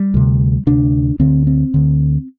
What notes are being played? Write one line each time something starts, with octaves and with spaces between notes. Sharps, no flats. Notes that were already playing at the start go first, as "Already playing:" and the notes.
Already playing: G3
D2 C3
D2 C3 D4
D2 D3 C4
C4
D2 D3